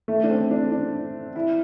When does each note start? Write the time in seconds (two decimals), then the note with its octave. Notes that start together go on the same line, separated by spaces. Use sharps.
0.08 A3
0.24 D4
0.30 C4
0.51 D4
0.72 D4
1.36 E4